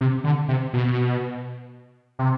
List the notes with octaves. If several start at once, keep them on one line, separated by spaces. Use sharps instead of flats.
C3
D3
C3
B2
C3